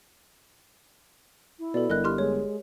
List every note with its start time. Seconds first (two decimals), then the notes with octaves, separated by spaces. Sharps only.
1.59 E4
1.74 B2 A4 D5
1.90 G1 A#4 D#5 F#6
2.04 G4 C6 F6
2.18 G#3 C#5